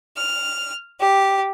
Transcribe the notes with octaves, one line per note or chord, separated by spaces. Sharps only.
F6
G4